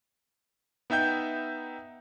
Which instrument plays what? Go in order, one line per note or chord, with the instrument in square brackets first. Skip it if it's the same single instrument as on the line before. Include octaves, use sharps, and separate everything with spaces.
[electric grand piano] B3 D#4 E5 G5 G6